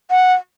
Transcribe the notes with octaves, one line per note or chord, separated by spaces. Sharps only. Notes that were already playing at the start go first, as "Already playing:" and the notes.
F#5